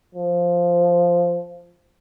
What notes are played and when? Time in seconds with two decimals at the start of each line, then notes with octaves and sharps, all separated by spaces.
0.14 F3